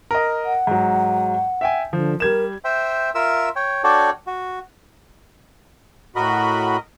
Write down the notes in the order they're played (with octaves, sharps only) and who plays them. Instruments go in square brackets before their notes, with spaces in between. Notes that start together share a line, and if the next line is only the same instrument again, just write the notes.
[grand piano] A#4 D#5
[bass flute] F#5
[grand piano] G#2 F#3
E5 G5 G#5
[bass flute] D3 [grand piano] F3
[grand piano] G3 G#6 E7 [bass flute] A#4
[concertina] C5 E5 G5
F4 A#4 E5 E6
C#5 G5
D4 F#4 A4 C#5 D5 G5
F#4
[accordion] A2 F#4 B5 [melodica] A#4 D#5